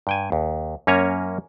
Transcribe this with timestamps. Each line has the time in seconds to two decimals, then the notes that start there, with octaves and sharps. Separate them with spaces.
0.07 G2 G5 G#5
0.32 D#2
0.87 F#2 A#3 C#4 C#5 G#5 A#5